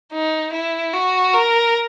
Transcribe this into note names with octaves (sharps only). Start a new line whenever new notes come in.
D#4
E4
F#4
A#4